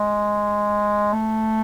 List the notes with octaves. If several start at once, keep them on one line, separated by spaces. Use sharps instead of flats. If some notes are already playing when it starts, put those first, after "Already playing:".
Already playing: G#3
A3